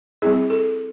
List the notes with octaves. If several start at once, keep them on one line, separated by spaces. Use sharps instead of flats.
G3 C4 E4 G#4
A4